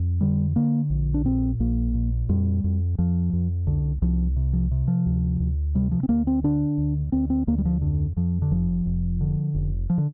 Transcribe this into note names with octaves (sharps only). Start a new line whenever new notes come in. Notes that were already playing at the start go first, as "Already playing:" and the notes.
Already playing: F2
D3 G3
D3 A#3
A#1
D4
A#2 C4
A#1 A#3
A#2
F2 G3
F2
F2 F3
F2
C2 D3
C2 F3
C3
F3
C3
F3
D2
D2
C3 G3
F3
C4
D2 A#3
C4
D3 D4
D2
D2 C4
C4
D2 A#3
G3
F3
F2 D3
F2 F3
D3
F1 F3
F1
D3
F1
F3
D3